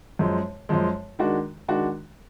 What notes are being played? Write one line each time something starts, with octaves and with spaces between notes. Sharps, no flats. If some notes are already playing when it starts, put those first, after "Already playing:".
F#2 F3 G#3
F#2 F3 G#3
D#3 G#3 D4 F#4
D#3 G#3 D4 F#4